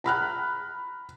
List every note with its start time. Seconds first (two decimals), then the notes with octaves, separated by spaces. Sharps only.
0.04 A#5 B5 F6 F#6